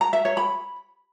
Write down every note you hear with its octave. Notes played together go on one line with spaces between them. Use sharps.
A#5
E5
C#5
B5